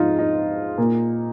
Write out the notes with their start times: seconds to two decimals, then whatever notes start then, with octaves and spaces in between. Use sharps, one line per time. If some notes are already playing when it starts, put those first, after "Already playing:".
Already playing: G#2 F3 G#3 D#4 F4
0.19 D#4
0.78 A#2 A#3